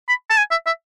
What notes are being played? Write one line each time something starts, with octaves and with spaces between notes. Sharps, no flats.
B5
A5
G#5
E5
E5